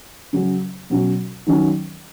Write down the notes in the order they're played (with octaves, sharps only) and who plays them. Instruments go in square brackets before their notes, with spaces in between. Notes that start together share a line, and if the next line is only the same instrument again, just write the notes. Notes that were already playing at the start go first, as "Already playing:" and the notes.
[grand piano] C#3 F#3 C#4
B2 F#3 C#4 F#4
D#3 F#3 C#4